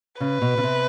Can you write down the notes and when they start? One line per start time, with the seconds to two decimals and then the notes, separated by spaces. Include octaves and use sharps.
0.20 C#3 B4
0.42 B2
0.58 C#3
0.63 C3